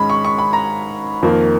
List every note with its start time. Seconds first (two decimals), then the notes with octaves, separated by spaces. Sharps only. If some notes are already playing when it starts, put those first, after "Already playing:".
Already playing: G#2 D#3 G#3 C#4 B5
0.10 C#6
0.24 C#6
0.38 B5
0.53 A#5
1.23 F2 D#3 A#3